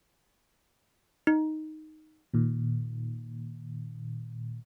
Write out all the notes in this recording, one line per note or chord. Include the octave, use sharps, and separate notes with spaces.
D#4
A#2 D#3